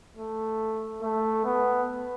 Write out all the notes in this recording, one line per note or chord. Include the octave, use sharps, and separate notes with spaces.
A3
A3
B3